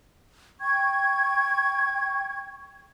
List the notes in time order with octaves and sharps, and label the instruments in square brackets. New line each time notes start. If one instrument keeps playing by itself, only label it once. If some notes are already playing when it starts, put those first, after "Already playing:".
[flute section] G5 C#6 G#6